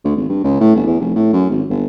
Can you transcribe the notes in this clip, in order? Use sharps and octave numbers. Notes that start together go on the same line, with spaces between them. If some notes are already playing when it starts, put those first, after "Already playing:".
D2
G#1
G2
C#2
A2
G1
E2
F1
A2
F#2
G#1
G1